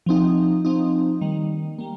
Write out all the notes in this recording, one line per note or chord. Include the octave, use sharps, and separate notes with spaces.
F3 C4 D#4
F3 C4 D#4
D#3 G3 A#3
G3 A#3